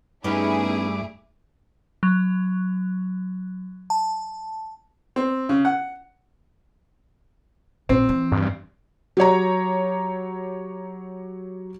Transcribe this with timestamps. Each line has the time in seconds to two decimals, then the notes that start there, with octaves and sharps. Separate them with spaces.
0.24 G2 A3 B3 C#4 D#4 E4 G#4 D6
2.03 F#3
3.90 A5
5.16 C4
5.49 C#3
5.65 F#5
7.89 A#1 C4
8.09 E3
8.32 G2
9.17 F#3 G4 C#5 A#5